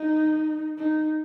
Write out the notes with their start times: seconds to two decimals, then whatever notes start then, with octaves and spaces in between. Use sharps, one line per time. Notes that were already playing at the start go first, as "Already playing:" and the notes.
Already playing: D#4
0.78 D#4